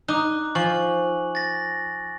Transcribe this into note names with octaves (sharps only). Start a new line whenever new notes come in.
D#4 D6 F#6
F3 G#5 C#6 F#7
A6 A#6